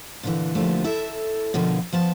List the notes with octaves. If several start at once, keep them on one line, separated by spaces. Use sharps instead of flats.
A#2 D3 E3
D3 F3 G3 A3 A#3
E4 A4 E5
B2 D3 F3 F4 A#4
F3 B3 A5